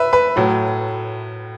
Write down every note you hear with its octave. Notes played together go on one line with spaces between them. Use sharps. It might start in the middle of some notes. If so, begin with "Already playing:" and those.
Already playing: B4 E5
B4
A2 F#3 A3